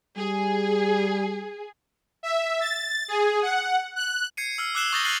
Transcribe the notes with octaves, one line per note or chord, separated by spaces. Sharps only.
G3 G#4
E5
A6
G#4
F#5
F#6
G#6 C7 C#7 D#7
E6 F6 C7
D6 E6 F#6 C7 E7 G7
C#6 D#6 G6 A6 A#6 G7
F6 F#6 A6 C7 F#7